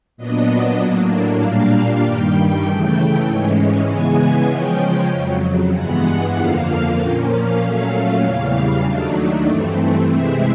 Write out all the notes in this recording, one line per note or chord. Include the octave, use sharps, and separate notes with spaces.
A#2 F#3 B3 D4 D#5
A2 F#3 A#3 D4
A#2 G3 A#3 D4 F5
G2 D#3 G3 G5
C#3 E3 A3 G5
G#2 E3 G#3 C#4
C#3 E3 G#3 B3 G#5
C#3 F3 G#3 C#4 G5
F2 C#3 F#3
G2 E3 G#3 B3 F#5
F2 D3 F3 A#3 F5
A#2 F3 A#3 C#4 G5
F5
A#2 F#3 A3 C#4 F5
E2 C#3 E3 G3
D#2 D#3 F#3 A3 D4
G2 E3 A3 C4
C3 E3 G#3 C4 E5